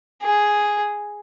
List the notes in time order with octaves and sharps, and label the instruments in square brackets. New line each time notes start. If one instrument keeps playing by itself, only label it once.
[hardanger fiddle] G#4